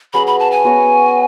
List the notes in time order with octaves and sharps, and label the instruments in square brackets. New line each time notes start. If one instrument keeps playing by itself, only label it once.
[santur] F#3 C#4 G#4 B4 [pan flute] B5
[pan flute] B5
A5
G#5
[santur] B3 F#4 C#5